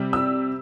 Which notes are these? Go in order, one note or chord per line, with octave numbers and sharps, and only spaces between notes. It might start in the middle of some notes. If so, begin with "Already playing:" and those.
Already playing: C3 G3
E6